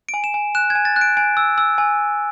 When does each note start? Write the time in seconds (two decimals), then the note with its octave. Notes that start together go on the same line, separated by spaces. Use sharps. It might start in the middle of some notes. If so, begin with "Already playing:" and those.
0.09 D7
0.14 G#5
0.24 E7
0.34 G#5
0.55 F#6 E7
0.70 G#6
0.75 G#5
0.85 A6
0.96 F#6
1.01 D7
1.17 G#5 D7
1.37 E6
1.58 E6
1.78 G#5